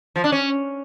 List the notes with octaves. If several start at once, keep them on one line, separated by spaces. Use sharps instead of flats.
F3
D4
C#4